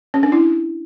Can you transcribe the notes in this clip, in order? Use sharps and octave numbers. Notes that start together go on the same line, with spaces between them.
C#4
D4
E4